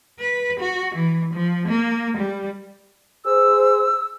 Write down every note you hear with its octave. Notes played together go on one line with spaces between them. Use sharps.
B4
F#4
E3
F3
A#3
G3
G#4 C5 E6